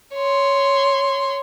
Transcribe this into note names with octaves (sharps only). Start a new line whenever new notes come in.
C#5 C6